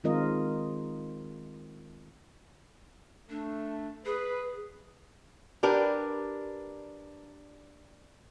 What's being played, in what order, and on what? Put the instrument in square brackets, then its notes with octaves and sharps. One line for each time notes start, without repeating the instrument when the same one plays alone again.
[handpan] D#3 G#3 C4 F4 A#4 D#5
[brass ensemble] A3 [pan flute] D4
[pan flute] G#4 [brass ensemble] B4
[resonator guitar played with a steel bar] D4 G4 A#4 B4